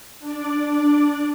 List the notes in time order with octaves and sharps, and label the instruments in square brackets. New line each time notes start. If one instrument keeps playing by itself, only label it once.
[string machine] D4 D5